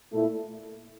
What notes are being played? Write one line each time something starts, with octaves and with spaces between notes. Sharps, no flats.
A#2 A3 E4